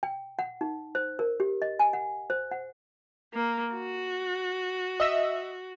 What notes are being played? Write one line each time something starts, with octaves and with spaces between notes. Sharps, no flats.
G5
F#5
D#4
C5
A#4
G4
D#5
G#5
F#5
C5
F#5
A#3
F#4
D#5 E5 E6